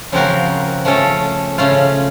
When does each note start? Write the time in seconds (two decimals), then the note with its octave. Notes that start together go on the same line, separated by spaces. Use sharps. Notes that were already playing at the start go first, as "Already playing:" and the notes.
0.12 C#3 F3 C4 F#4 A#4
0.85 F3 A3 C#4 A4
1.58 C#3 A3 C#4 F4